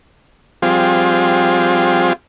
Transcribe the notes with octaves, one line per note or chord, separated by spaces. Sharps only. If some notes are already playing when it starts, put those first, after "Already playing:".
F3 G3 C4 F4 G#4